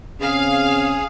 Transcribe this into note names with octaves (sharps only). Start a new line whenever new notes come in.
C#3 C4 C#4 G#4 F5